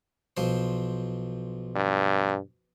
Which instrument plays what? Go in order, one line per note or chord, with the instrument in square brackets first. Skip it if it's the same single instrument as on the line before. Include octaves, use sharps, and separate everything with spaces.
[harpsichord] B1 F3 C5
[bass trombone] G2